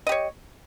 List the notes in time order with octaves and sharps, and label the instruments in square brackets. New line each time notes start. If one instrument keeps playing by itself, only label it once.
[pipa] D#5
G4
C#5